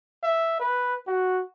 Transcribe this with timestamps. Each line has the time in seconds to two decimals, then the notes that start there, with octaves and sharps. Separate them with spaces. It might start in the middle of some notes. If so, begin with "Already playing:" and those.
0.24 E5
0.60 B4
1.07 F#4